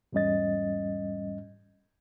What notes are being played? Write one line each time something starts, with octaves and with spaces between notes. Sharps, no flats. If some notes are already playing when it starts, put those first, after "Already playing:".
E2 G#2 G3 C#4 D#5 A6